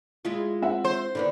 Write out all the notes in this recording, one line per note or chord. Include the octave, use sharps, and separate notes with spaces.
G#3 E4 F4
C4 E5 F#5
C5
D3 D#3 B3 E4